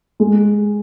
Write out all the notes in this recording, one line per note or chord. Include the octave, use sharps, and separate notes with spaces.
G#3